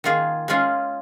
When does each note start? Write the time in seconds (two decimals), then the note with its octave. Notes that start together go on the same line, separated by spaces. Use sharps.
0.04 D#3 A#3 F4 G#4
0.48 G#3 C#4 F4 G#4